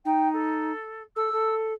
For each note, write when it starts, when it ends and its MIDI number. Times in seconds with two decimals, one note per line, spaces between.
0.05 0.72 63
0.05 0.28 79
0.33 1.03 69
1.16 1.30 69
1.16 1.54 88
1.33 1.74 69